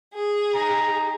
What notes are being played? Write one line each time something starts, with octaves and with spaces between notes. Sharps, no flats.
G#4
D#4 A#5